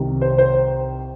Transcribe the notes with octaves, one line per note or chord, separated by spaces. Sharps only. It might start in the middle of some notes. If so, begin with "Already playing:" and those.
Already playing: C2 C3 D#3
C5
C5